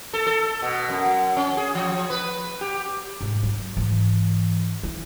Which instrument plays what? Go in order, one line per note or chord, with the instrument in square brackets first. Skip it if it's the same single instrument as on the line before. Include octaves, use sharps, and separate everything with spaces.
[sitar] A4
A4
B2
F#2
C#4
G#4
F3
B4
G4
[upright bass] G#2
F#3
G#2 E3
E3